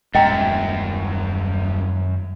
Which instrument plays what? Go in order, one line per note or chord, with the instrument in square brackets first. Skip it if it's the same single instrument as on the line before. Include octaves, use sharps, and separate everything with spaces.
[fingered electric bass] D#1 A#2 G#3 [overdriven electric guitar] F#2 [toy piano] D#5 G5 A#5